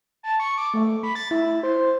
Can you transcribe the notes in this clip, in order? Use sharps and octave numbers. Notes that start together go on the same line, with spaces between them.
A5
C#6
D6
A3
B5
A6
E4
C5